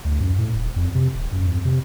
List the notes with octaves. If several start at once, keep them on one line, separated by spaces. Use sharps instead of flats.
D2
F#2
A2
D#1
F2
C3
D1
F#2
F2
C3